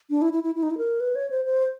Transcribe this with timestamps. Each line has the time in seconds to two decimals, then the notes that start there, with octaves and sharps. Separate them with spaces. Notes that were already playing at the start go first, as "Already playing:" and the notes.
0.10 D4
0.22 E4
0.33 E4
0.43 E4
0.55 E4
0.63 D#4
0.70 E4
0.78 A#4
1.00 B4
1.15 C#5
1.30 C5
1.45 C5